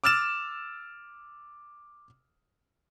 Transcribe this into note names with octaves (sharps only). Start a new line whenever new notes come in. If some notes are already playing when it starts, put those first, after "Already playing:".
D6 E6 F6 A6 E7